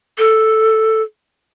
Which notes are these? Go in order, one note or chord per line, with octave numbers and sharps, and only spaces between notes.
A4